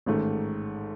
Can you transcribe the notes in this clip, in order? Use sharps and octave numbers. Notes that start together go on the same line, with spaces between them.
A1 G#2 D#3 A3